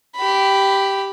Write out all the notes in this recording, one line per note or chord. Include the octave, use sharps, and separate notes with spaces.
G4 B5